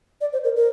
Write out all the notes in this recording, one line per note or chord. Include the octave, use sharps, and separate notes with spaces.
D5
C5
A#4
A#4